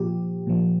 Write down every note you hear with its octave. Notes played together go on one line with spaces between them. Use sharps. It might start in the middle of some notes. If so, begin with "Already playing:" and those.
Already playing: A#2 F3 G4
A#2 F3